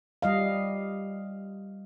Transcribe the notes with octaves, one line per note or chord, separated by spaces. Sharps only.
G3 D#5 F5